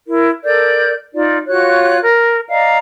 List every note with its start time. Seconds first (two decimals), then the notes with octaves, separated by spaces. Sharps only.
0.07 E4 A#4
0.44 A4 A#4 D5 G6
1.14 D#4 F4 D5
1.48 F4 F#4 C#5 F#6
2.01 A#4
2.50 D5 D#5 F5 A#5